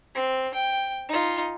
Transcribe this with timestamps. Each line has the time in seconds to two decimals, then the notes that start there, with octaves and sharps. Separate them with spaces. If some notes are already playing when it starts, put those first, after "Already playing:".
0.15 C4
0.54 G5
1.08 D#4 F4